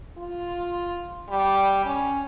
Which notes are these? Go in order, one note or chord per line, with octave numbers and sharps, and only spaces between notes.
F4
G3
C#4